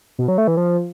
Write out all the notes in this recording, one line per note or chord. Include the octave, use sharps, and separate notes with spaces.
B2
F#3
A3
E3
F3